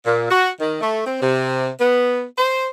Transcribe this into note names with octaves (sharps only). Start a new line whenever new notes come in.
A#2
F#4
D#3
A3
C4
C3
B3
C5